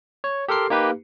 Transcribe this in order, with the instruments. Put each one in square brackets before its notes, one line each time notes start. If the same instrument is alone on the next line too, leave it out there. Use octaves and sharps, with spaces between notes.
[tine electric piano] C#5
G4 A4 A#4 C6 C7
A#3 D#4 G4 B4